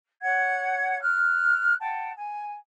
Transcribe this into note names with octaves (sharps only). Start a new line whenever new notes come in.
C#5 F#5 G#6
F6 F#6
F#5 G5 A5
G#5